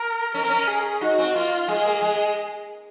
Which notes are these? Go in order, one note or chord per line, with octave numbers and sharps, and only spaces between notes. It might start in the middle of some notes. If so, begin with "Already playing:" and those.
Already playing: A#4
C#4 A#4
C4
C#4
G#4
D#4 F#4
C4
A#3 F4
G#3 G#4
A#3
G#3